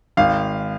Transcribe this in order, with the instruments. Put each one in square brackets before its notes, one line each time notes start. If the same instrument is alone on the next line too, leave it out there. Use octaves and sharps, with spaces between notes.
[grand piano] G#1 F5